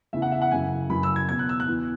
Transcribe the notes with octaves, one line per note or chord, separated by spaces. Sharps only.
E2 C#3 E3 E5
F#5
E5
F#5
F#2 C#3 E3 G#5
F#2 C#3 E3 B5
E6
G#6
E2 B2 G#6
F#6
E6
F#6
E2 E3